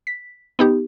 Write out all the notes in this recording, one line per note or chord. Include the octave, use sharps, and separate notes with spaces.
B6
B3 D#4 G4